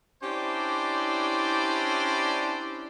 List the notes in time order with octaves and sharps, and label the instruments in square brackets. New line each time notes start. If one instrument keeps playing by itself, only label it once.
[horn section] C#4 D4 E4 G4 C5 D5